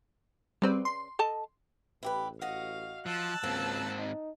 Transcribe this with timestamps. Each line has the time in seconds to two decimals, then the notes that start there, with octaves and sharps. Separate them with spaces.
0.62 C#3 G3 C4 B4 D5
0.85 C6
1.19 A4 D#5 A5
2.03 A1 E4 G4 B4
2.41 F#4 D#5 F5
3.06 F3 A5 E6 F#6
3.43 C#2 G#2 A#3 C4
3.99 D#4